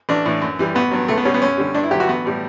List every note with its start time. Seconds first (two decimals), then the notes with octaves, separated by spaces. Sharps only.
0.09 A1 D4
0.25 A2 E3
0.42 F#2
0.59 E3 G3
0.75 A1 B3
0.91 G2 F#3
1.08 C#2 A3
1.17 B3
1.25 B2 G3 C#4
1.34 B3
1.42 F#2 C#4
1.58 D3 G3
1.74 G2 D4
1.83 E4
1.91 D3 F#3 G4
2.00 F#4
2.08 A1 B3
2.25 A2 G3